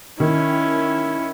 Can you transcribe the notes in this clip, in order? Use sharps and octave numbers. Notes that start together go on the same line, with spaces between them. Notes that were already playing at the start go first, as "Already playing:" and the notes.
D#3 C#4 E4